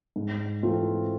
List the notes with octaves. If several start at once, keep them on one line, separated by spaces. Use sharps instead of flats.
G#2
E3 A3 C4 F4